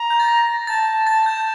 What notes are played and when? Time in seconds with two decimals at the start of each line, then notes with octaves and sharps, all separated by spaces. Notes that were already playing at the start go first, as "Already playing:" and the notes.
Already playing: A#5
0.10 G6
0.20 A6
0.28 A#6
0.67 A5 A6
1.07 A6
1.23 A6
1.26 G6